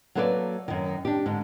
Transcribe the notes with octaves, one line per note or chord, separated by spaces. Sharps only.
F#3 A#3 A4 B4 C#5 D5
F#2 D#3
D4 G4
G#2 D3